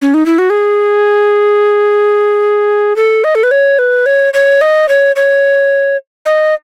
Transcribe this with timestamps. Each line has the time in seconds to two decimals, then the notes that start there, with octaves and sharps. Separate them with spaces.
0.02 C#4
0.14 D#4
0.26 E4
0.38 F#4
0.50 G#4
2.96 A4
3.24 D#5
3.35 A4
3.43 B4
3.51 C#5
3.79 B4
4.06 C#5
4.34 C#5
4.61 D#5
4.89 C#5
5.16 C#5
6.26 D#5